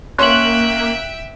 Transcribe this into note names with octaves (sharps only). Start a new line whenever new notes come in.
A#3 C#4 C#5 E5 G5 C6 F#6 F#7